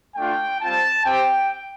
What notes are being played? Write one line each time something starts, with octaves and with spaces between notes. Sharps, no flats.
A3 D4 F4 G5
G3 C4 F4 A5
C4 G4 G5